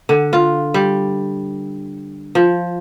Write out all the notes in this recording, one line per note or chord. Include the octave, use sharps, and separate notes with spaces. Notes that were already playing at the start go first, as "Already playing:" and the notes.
D3
F4
G3
F3